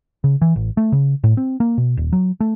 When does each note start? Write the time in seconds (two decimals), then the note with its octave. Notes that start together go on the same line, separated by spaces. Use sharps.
0.24 C#3
0.42 E3
0.56 A1
0.77 A3
0.92 C#3
1.24 A2
1.37 C4
1.60 A#3
1.78 B2
1.97 D#1
2.13 F#3
2.40 A3